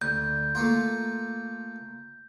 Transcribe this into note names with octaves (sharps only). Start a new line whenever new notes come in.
D2 G6
A3 A#3 F4